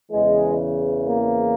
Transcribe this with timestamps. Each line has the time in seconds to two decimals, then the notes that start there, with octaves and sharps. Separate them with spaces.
0.12 E2 C#3 E3 G#3
1.07 A#3